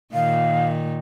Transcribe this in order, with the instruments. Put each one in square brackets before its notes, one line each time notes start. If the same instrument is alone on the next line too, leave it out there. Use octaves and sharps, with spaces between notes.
[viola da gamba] A#2 D#3 [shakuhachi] F5